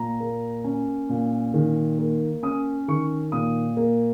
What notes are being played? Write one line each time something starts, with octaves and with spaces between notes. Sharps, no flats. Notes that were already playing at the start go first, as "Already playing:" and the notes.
Already playing: A#2 A#5
A#3
C#4
A#2
D#3
A#3
C#4 D#6
D#3 C#6
A#2 D#6
A#3